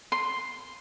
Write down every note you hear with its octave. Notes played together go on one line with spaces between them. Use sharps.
C6